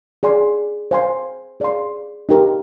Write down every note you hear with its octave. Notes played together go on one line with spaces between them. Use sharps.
G#4 D5 G#5 C6
C5 F5 G#5 C6
G#4 D5 F5 C6
D#4 G4 A#4